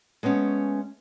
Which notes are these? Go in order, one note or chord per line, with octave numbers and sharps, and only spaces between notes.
G#3 A3 B3 C#4